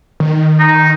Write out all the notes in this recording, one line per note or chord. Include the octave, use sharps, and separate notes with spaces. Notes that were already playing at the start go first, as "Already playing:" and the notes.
D#3
D#4